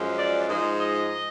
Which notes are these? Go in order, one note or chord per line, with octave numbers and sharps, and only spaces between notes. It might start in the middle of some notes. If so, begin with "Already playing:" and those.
Already playing: F#2 F3 G#3
D5
G#2 F3 G#3 D#5
D#5